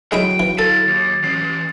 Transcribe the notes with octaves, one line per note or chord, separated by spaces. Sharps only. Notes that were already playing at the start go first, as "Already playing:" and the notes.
F#3 G#3 E4 G#4 E5 G5
E3
E4 A4 F5 A6
D#2
E3 C#4 C7